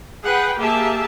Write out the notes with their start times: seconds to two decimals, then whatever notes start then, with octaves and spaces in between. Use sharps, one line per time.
0.24 G#4 B4 F#5 G5
0.59 A#3 G4 G#4 E5 A5